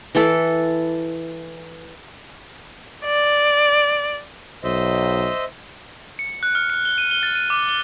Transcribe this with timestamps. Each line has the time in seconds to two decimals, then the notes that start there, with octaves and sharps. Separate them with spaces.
0.15 E3 A4
3.05 D5
4.64 B1 C5 D#5 E5
6.19 C#7
6.43 F#6
6.55 F6
6.70 C#7
6.85 G7
6.98 D#7
7.11 G7
7.23 A6
7.35 D#7
7.50 D6
7.69 G7